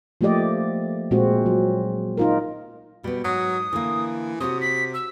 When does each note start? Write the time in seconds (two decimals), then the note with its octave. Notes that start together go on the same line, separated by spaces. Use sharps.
0.21 F3 A3 A#3 G4 D5 D#5
1.11 A#2 G#3 C4 F#4
1.46 F#3
2.17 D#4 F4 A#4
3.04 B2 G3 B3
3.24 G#2 F#3 D#6
3.73 D3 E3 A#3
4.40 C3 F#4 C#5 D#6
4.61 B6
4.94 E6